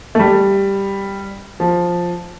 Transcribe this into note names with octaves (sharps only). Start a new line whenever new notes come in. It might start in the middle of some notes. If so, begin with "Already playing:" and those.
A3
G3
F3